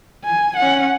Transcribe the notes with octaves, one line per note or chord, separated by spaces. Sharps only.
G#5
C#4 F#5